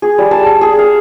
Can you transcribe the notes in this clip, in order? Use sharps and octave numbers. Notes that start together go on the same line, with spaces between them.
G#4
G3
A5
G#4
F5